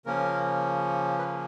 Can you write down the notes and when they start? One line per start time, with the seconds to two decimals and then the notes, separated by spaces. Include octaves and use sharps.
0.06 C#3 F3 A#3 C#4 A#4
1.19 B4